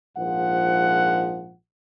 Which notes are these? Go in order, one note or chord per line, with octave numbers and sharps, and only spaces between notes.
A#1 G#2 F3 F#5